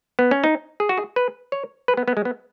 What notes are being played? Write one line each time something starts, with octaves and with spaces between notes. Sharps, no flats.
B3
C#4
D#4
G#4
F#4
G#4
B4
C#5
B4
B3
B3
G#3
B3